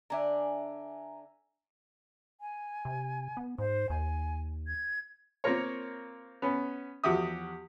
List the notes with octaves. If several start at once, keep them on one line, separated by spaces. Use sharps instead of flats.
D3 D4 E5 G#5 A#5
G#5
C3
B3
G#2 C5
D#2 G#5
G#6
A#3 C4 F4 A#4 C#5
B3 C#4
E2 F3 F#4 G4 E5 D#6